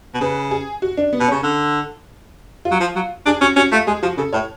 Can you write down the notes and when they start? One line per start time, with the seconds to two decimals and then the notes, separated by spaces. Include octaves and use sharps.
0.14 B2
0.21 C#3 B4
0.51 G#4
0.82 F#4
0.97 D4
1.13 B3
1.20 B2
1.28 C#3 C#4
1.43 D3
2.65 F4
2.71 F#3
2.80 F3
2.96 F#3
3.26 D4 G#4
3.41 C#4 F#4
3.56 C#4 F#4
3.72 A3 F4
3.87 G#3 G#4
4.03 F3 F#4
4.17 C#3 A4
4.33 A2 C#5